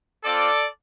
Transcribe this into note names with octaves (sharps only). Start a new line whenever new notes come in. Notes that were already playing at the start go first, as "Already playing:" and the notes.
C4 F4 A4 D5